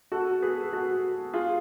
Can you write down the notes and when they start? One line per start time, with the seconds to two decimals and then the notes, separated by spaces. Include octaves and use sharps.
0.12 F#4 A4
0.42 G#4 B4
0.73 F#4 A4
1.33 F4 G#4